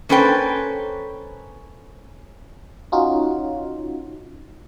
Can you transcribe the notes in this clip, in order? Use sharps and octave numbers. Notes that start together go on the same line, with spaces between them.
A#3 C#4 A4 B4 C5 G5
C#4 D#4 F4 F#4